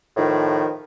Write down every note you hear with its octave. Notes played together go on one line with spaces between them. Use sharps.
A2 D#3 F3